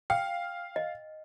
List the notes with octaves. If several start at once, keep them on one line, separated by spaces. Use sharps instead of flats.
F5 G5
D#5